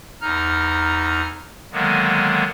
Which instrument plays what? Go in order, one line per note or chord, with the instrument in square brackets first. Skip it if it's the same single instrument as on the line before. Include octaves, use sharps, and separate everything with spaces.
[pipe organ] E2 D#4 A#5 F6
D3 D#3 F#3 G#3 A#3 B3